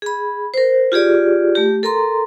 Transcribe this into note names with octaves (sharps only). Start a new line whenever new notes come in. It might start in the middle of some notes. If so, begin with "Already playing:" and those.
G#4 B5
A#4 C5
F4 G4 G#4 D5
A3 G4
A4 A#4 A#5 C6